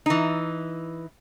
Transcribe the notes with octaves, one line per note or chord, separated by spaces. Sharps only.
E3 D#4